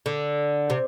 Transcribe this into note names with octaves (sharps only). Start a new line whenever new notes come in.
D3
C3